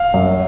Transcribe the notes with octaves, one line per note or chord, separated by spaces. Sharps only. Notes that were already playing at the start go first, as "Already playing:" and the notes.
Already playing: F5
F#2